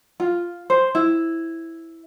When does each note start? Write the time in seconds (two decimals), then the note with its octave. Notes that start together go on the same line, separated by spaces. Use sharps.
0.20 F4
0.70 C5
0.95 E4